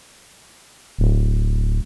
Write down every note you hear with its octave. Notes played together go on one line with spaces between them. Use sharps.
D1